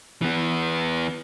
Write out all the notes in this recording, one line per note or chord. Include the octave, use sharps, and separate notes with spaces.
E3 B3